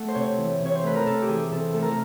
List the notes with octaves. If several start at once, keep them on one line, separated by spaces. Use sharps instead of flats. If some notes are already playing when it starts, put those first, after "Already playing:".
Already playing: A3 F#5
C5
C3 C#5
E3
C3 C#5
C5
A3 B4
A#4
C3 A4
G4
E3 G#4
C3 A4
A3 A4
A#4
A4